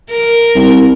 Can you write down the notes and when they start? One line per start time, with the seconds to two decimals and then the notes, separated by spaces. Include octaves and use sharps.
0.10 A#4
0.55 C2